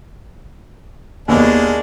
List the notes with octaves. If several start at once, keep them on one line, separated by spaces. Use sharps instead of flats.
D#2 G#3 A#3 B3 D4